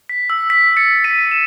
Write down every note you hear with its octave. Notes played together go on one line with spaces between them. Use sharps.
B6
E6
B6
A6 C#7
B6 D#7
E7